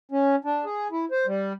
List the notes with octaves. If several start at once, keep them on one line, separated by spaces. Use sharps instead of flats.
C#4
D4
G#4
E4
C5
G3